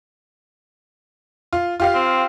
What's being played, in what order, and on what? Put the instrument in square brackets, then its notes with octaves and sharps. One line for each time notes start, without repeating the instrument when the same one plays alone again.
[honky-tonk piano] F4
F4 G4 F5
[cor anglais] C4